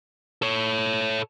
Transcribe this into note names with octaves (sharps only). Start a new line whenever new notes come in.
A4 C#5